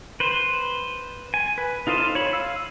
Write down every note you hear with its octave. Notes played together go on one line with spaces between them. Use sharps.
B4 C5
G#5
B4
D#4 F4 A4 C5 D#5
C#5 B5
F5 E6